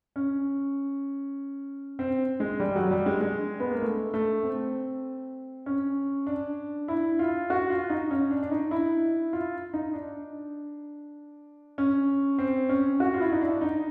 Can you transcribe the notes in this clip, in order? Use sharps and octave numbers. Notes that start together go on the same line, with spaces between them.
C#4
C4
G#3
G3
F#3
G3
G#3
G#3
B3
A#3
A3
A3
C4
C#4
D4
E4
F4
F#4
F4
D#4
C#4
D4
D4
D#4
E4
F4
D#4
D4
C#4
C4
C#4
F#4
F4
E4
D#4
D4
D#4